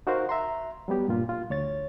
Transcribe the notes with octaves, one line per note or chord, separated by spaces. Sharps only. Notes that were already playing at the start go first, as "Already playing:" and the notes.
D#4 F#4 A#4 C5 F5
E5 A#5 C6
F#3 G3 B3 G4
G2 A#2 F4
F4
D2 C#5 A6